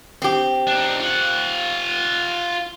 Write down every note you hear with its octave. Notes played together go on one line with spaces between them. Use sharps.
C4 G4
D4 D#4
F4 F#5